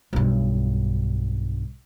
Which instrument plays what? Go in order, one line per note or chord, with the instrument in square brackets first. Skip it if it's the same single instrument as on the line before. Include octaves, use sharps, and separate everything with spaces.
[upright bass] B1 G2